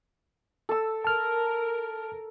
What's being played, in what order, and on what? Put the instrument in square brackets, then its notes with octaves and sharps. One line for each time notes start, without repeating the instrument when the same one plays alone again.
[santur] A4 E6
[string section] A#4 [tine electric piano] A5 F6